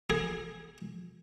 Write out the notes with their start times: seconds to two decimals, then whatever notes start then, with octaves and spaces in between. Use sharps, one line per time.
0.10 G#4